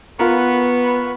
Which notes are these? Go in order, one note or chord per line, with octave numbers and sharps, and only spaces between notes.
B3 F4 A#4 B4 B5 C#6